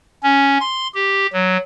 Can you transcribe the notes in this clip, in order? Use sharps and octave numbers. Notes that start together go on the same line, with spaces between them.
C#4
C6
G4
F#3